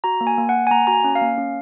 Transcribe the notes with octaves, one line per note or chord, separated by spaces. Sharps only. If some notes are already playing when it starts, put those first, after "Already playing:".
F#4 A#5
A#3
G#5
A#3
F#5
A#3
G#5
A#3 A#5
F#4 A#5
G#5
C#4
F5
A#3
C#4